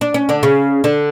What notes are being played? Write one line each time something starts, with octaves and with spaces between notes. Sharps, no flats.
D4
C#4
D3 D4
C#3 C#4
D3 D4